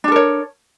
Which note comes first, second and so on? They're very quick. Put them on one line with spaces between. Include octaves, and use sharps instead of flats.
D4 A4 A#4 C#5